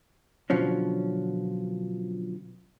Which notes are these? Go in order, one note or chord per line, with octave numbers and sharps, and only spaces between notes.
B2 D3 F3 F#3 C#4